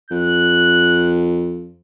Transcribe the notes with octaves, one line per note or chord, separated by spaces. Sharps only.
F2 F#6